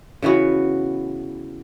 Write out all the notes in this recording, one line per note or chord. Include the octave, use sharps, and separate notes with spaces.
C#3 E3 B3 F#4